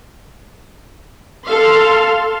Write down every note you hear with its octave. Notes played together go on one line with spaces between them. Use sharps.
A4 F5 C6